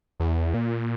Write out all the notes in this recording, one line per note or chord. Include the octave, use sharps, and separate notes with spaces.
E2
A#2